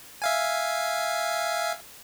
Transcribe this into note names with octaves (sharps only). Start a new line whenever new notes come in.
E5 F5 G#5